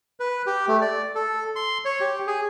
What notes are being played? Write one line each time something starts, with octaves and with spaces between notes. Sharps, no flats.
B4
G4
A3
D5
A4
C6
C#5
G4
G#4